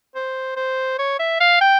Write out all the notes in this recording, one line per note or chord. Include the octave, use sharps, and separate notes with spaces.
C5
C5
C#5
E5
F5
G5